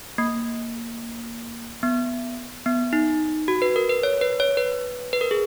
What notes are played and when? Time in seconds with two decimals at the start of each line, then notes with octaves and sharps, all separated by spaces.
0.18 A#3
1.83 B3
2.66 B3
2.93 D#4
3.48 F#4
3.62 B4
3.76 A#4
3.89 B4
4.03 C#5
4.21 B4
4.40 C#5
4.57 B4
5.13 B4
5.21 A#4
5.31 G#4